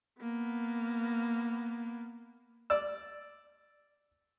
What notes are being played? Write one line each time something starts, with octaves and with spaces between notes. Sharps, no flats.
A#3 B3
D5 E6